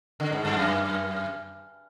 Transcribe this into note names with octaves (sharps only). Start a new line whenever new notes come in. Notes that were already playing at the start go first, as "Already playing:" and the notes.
D3
G#2
G2
F#2